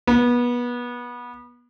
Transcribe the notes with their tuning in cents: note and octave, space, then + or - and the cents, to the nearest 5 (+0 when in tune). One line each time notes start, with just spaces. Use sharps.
B3 -25